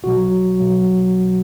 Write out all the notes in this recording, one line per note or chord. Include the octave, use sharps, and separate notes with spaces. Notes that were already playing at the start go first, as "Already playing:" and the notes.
B1 B2 F#3 F#4
B2 F#3